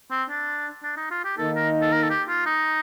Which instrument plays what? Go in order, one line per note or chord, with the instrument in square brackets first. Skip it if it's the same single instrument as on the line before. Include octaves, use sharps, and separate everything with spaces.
[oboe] C4
D4
D4
D#4
F4
G4
[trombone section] D#3 A#3 D#4 [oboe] A4
[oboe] A#4
A4
A#4
A4
G4
F4
D#4